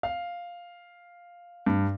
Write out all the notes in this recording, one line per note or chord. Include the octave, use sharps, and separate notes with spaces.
F5
G2